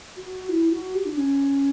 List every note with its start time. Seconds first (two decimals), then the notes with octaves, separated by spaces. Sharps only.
0.17 F#4
0.49 E4
0.71 F#4
0.95 G4
1.05 D4
1.16 C#4